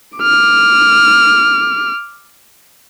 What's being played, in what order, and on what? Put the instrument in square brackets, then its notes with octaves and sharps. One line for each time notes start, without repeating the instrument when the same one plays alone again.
[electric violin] D6 F6